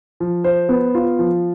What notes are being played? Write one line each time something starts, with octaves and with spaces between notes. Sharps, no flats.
F3
C5
B3
F4
F3